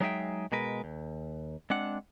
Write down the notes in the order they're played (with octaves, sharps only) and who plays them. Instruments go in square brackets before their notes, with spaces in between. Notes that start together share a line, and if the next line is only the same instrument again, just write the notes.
[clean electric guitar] F#3 G#3 D#4 G#4 E5 G5
B2 G#3 A#4 B4
D#2
G#3 C4 D4 F#5